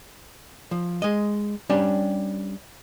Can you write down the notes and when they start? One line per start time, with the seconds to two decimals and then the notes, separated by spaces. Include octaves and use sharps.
0.71 F3
1.02 G#3 D#5
1.70 G3 C#4 D4 G4